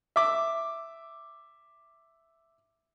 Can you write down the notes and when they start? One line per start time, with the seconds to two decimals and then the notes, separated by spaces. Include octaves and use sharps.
0.16 E5 D6